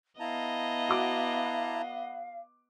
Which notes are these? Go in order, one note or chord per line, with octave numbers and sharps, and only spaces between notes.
B3 E4 D#5 F5 A5 A#5
F#4 B5 D6